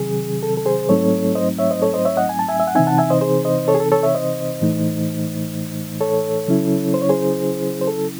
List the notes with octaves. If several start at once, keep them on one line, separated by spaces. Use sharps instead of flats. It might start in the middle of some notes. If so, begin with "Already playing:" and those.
Already playing: C3 D#3 F#3 C4 G#4
A4
A4
G#4 C5
G#2 F#3 A3 C4 D#4 A4 C#5
C5 D#5
C#5 E5
C5 D#5
A4 C#5
C5 D#5
C#5 E5
D#5 F#5
G#5
A5
E5 G#5
E5
F#5
C3 E3 C4 D#4 E5 G#5
F#5 A5
E5 G#5
C5 D#5
G#4 C5
C5 D#5
A4 C#5
G#4
A4
A4 C#5
C#5 E5
C5 D#5
A2 E3 A3 D#4
A4 C#5
C#3 F#3 C#4 E4
C5
C#5
G#4 C5
C5
A4